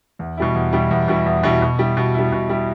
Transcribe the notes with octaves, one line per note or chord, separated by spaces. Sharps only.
E2
B2 G3 E4
E2
B2 G3 E4
E2
B2 G3 E4
E2
B2 G3 E4
B2
G3 E4
B2
G3 E4
B2
G3 E4